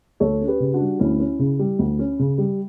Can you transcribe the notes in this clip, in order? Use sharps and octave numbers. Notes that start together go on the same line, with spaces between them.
D2 A4 C#5
C#4
G4 B4
C#3
D4 F#4
G3
D2 C#4 E4
C#4
C#3
G3
D2
C#4
C#3
G3